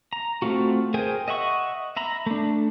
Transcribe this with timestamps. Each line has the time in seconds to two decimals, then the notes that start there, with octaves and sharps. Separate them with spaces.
0.13 A#5
0.42 A3 C4 F4 F#4
0.94 G#4 A#4 C5 G5 G#5
1.28 D#5 E5 F#5 C#6
1.97 E5 A#5 B5
2.26 A3 D4